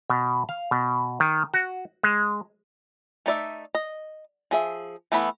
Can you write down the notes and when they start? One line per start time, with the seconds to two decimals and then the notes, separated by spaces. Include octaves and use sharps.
0.10 B2
0.49 F5
0.71 B2
1.20 D#3
1.54 F#4
2.03 G#3
3.26 A3 D#4 D5 E5
3.75 D#5
4.51 F3 G#4 E5
5.12 E3 A3 B3 E4 B5